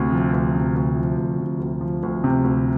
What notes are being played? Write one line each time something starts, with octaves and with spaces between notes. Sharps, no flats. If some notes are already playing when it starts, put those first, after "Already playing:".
Already playing: D2 C3
F3
D2
C3
D2
F3
D2
C3
D2
F3
D2
C3
D2